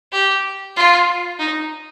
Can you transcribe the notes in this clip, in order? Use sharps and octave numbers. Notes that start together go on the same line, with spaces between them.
G4
F4
D#4